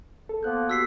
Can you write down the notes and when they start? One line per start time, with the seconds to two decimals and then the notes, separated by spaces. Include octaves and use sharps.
0.29 A4
0.43 F3 A#3 B3 F#6 G6
0.70 F#4 G4 E6 B6 C7